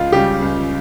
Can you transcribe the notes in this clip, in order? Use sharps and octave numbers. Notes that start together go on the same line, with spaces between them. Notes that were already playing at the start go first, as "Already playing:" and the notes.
Already playing: C#2 F4
C#3 G3 G4
C#2